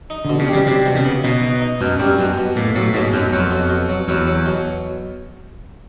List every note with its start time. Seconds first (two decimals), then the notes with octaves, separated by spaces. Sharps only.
0.10 D#4
0.25 B2 D3
0.39 C#3
0.47 G3
0.53 C#3
0.67 C3 G3
0.86 B2
0.95 C#3
1.05 B3
1.24 B2 D#4
1.43 D#4
1.62 D#4
1.81 F#2 B2
1.99 F#2 G3
2.19 F#2 B2
2.38 B2
2.56 A2 A#3
2.75 A2 F#3
2.94 G#2 B2
3.13 F#2 B2
3.32 F2 F#3
3.51 B2
3.70 B2
3.89 F#3
4.08 E2 F#3
4.27 F#3
4.46 B2